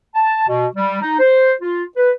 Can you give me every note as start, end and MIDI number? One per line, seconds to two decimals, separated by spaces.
0.15 0.44 81
0.48 0.67 47
0.75 1.02 55
1.02 1.18 63
1.19 1.52 72
1.60 1.83 65
1.96 2.11 71